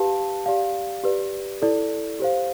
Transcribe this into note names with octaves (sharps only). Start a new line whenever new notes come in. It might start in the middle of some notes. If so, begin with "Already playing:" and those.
Already playing: G4 B4 F5 A5
G4 D5 F5
G4 B4 D5
E4 A4 D5
G4 C5 F5